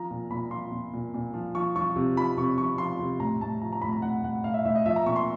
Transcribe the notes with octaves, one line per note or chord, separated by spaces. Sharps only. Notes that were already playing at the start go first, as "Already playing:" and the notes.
Already playing: F3 A#5
A#2
A#2 B5
F3 C6
A#2
A#2
A#2
F3
F3 C#6
F3 C#6
C3
F3 B5
C3 C#6
F3 C#6
F3 C6
C3
A2 A#5
A2 A5
F3 A#5
A#5
A2 B5
A#5
A2 F#5
A2 F#5
A2 F5
E5
A2 E5
D#5
F3 E5
A#5
A#2 C#6
C6